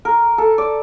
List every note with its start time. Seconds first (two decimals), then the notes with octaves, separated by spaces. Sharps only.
0.05 A#4
0.38 A4
0.58 D5